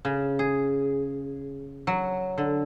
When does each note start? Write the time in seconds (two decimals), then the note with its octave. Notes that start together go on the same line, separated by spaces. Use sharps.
0.05 C#3
0.39 G#4
1.87 F#3
2.38 D3